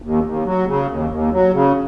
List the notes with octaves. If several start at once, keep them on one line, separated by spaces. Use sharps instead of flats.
D#2
D#2
F#3
C#3
D#2
D#2
F#3
C#3